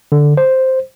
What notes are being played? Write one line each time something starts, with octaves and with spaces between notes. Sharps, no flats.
D3
C5